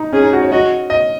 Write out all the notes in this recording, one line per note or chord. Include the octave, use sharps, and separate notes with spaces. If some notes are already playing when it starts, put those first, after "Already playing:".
Already playing: D#4
C#4 G#4
D#4
F#4
C#5
F#4 D#5
D#5